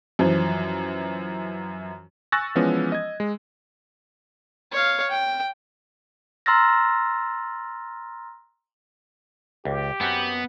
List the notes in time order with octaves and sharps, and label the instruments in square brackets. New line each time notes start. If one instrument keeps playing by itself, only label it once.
[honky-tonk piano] F#2 E3 F3
[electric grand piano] G#5 C#6 E6 F#6 A6 A#6
E3 F3 G#3 B3 C#4
D#5 G#6
G#3
[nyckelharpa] C#5 F5
G5
[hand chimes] A#5 C6 E6 F6 A6 A#6
[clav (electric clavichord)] C#2 [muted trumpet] G4
[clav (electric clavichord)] F#2 C4 F#4 [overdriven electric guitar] B3